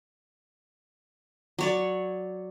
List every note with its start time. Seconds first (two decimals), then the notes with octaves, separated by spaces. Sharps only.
1.59 F#3 C#5 D5